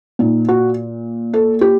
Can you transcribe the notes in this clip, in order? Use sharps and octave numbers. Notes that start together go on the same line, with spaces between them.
A#2 D#4
F#4
A4
G4